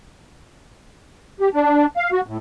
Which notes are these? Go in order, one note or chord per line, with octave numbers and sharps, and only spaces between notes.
G4
D4
F5
F#4
A2